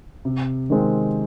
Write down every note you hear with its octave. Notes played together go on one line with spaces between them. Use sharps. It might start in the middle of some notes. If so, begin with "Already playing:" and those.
C3
D#3 G#3 C4